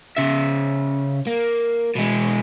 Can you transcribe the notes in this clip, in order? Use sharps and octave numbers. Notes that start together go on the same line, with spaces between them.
C#3 E5
A#3
B2 G#3